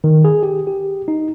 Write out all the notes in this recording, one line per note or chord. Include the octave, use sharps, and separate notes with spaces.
D#3
G#4
G4
G4
D#4